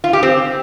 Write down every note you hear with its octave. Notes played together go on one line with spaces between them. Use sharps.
F4
G4
C4